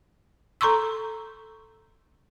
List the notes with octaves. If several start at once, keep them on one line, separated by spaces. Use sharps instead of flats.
A4 A#5 C6 C#6 E6